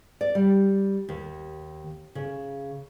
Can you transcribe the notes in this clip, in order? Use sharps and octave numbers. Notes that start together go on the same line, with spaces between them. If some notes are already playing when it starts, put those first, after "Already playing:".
D5
G3
D#2
C#3